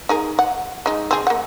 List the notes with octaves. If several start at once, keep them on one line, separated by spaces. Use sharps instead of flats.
D#4 G#4 A#4
F#5
G#3 D#4
C4 G#4
A#3 F#5